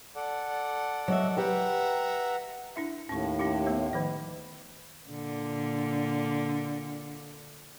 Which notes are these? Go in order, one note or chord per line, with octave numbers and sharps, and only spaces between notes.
A4 D5 F#5
F#3 D#5 E5
G4 B4 E5 F#5 G5 A#5
D4 E4 E5
D#2 A2 C#4 C#6
C#4 E4 G4
A3 B3 C5
D#3 F3 D#5
A#2 D3